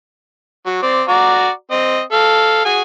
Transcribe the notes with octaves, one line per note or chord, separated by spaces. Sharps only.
F#3
C4 D5
F#4 D5 A#5
C4 D#5
A4 F5
F#4 G#4 G#5